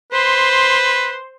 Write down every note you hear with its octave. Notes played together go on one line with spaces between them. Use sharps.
B4 C5 C6